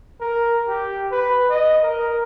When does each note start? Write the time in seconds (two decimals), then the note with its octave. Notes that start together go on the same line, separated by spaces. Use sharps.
0.21 A#4
0.68 G4
1.11 B4
1.50 D#5
1.83 A#4